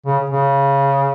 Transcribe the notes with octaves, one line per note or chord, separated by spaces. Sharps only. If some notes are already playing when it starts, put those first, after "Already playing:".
C#3
C#3